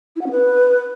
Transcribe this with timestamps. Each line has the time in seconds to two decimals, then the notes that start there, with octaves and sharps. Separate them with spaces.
0.16 E4
0.21 F#5
0.26 C#4
0.31 B4